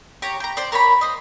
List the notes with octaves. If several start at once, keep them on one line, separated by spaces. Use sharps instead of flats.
G4 C#5 A#5
G5 A#5
C5 D5
A#4 C#5 A5 B5
C5 D#5